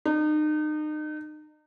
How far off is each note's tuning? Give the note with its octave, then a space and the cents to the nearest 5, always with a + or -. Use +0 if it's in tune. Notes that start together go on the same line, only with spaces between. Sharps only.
D#4 -35